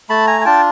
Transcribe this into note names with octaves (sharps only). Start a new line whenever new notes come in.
A3 A5 B5
G#5 A#5
G#5
D4 F4 G5 A5